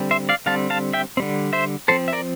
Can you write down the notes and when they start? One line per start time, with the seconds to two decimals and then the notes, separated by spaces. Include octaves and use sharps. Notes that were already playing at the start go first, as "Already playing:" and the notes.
Already playing: D3 G3 C4
0.11 C5 E5
0.29 D5 F5
0.46 D3 G3 C4 F5 A5
0.70 F5 A5
0.93 E5 G5
1.17 D3 G3 C4
1.53 C5 E5
1.88 F3 C4 A4 C5
2.08 E5
2.13 A#4 D5